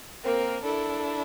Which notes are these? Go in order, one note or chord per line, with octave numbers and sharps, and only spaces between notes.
A#3 C4 A#4
D4 E4 A4